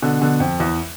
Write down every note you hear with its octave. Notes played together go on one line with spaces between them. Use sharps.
B2 D3
B2 D3
F2
E2